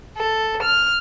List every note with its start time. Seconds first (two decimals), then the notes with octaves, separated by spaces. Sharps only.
0.17 A4
0.62 F6